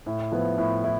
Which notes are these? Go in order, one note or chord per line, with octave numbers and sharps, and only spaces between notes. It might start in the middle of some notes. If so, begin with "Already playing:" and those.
A2
F3 B3 E4
A2
E4